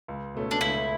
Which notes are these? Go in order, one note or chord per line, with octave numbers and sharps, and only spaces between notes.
C#2
B2 A3 C#4
D4
C#2 E4